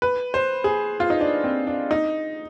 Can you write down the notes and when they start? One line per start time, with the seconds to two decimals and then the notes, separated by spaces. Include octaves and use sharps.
0.02 B4
0.34 C5
0.64 G#4
1.00 F4
1.10 D#4
1.21 D4
1.44 C4
1.67 D4
1.91 D#4